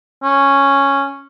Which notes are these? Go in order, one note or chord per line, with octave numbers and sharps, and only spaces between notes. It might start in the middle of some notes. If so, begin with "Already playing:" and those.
C#4